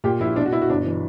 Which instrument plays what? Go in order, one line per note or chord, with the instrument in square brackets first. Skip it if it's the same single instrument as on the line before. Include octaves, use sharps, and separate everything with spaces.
[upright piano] A#2 G4
A#1 E4
B2 D4
F#4
B2 E4
F#4
G1 D4
E3